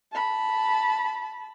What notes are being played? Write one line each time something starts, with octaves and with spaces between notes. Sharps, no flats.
A5 B5